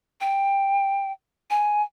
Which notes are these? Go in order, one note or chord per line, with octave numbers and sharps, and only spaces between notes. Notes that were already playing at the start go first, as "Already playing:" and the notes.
G5
G#5